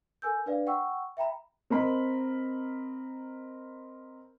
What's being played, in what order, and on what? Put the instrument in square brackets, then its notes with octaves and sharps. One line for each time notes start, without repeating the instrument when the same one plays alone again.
[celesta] A4 A#4 G#5 E6 G6
D4 B4 D5 F5
F#5 G5 C#6 E6
E5 G5 A#5 B5
[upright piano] C4 A#4 D#5 B5